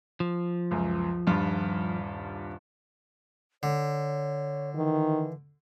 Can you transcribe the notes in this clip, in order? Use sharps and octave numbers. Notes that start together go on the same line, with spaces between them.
F3
C#2 F#2
D#1 G2 F4
D3 C#5
D#3 E3